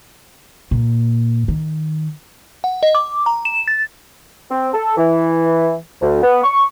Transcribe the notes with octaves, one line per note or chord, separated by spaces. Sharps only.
A#2
D#3
F#5
D#5
D6
A#5
E7
A6
C4
A4
E3
D2
B3
C#6